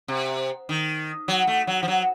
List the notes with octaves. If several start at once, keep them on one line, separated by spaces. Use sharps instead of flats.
C3
D#3
F#3
A3
F#3
F3
F#3